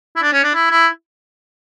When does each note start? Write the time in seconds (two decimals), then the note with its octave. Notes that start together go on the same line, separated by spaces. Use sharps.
0.16 E4
0.22 D4
0.33 C#4
0.43 D4
0.54 E4
0.70 E4